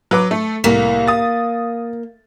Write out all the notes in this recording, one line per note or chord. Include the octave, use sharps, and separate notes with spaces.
F#3 B4 D6
A3 A4
C2 A2 A#3 B6
D#6 A6